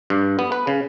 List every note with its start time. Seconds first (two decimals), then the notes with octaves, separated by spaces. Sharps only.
0.10 G2
0.39 B3
0.52 B4
0.67 C#3